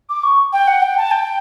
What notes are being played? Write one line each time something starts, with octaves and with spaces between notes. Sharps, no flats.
D6
C#6
G5
F#5
G5
A5
G5